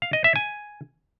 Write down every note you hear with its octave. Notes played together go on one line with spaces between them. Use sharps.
F5
D#5
E5
G#5